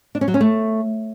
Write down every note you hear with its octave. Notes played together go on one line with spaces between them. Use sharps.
D4
C#4
F#3
C#4
A3